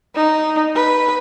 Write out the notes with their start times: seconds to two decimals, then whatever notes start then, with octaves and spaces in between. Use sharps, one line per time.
0.16 D#4
0.76 B4